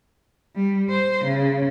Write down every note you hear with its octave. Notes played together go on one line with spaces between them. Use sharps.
G3
C5
C#3